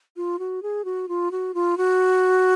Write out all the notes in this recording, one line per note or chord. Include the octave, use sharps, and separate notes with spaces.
F4
F#4
G#4
F#4
F4
F#4
F4
F#4